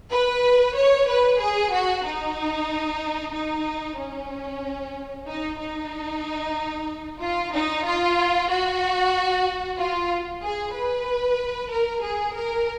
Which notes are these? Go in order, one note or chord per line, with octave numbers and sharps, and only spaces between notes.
B4
C#5
B4
G#4
F#4
D#4
D#4
C#4
D#4
D#4
F4
D#4
F4
F#4
F4
G#4
B4
A#4
G#4
A#4